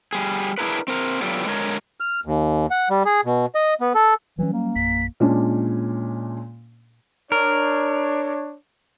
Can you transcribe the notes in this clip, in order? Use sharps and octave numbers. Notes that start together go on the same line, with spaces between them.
G3 G#4
D4 E4 G#4 A#4 B4
C4 A#4
F#3 B3 F4 G4 A4 D5
D3 G#3 A#4 C#5
F6
D#2
F#5
G3
G#4
B2
D#5
B3
A4
E3 F#3 G3 C#4
A#3
A#1 F#2 B6
A#2 G#3 C#4 D4
D4 A#4 C#5